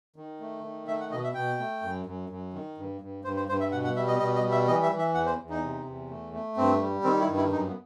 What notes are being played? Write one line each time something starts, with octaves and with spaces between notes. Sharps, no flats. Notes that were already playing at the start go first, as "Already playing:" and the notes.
D#3
A3
D#3
A3 E5
F#5
B2 D#5
E5
B2 G5
A3
F#2
F#2
F#2
D#3
G2
G2
G2 C5
C5
G2 C5
E5
B2 F#5
F#5
G3 E5
D#5
B2 D#5
D#5
G3
E5
E3 D#5
E5
E3
E5
E2 F#5
C5
E2
D#4
C3
E2
A3
A3
G2 C4
G3
D#3 C4
E4
G2
E4
F#2 D#4
B3